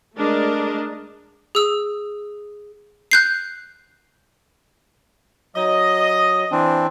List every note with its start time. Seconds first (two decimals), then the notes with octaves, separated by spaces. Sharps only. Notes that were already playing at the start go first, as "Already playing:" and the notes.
0.15 G#3 A3 D4 A#4 D#5
1.55 G#4 E6
3.11 F#6 G6 C7
5.56 F#3 D#5
6.52 E3 C4 D4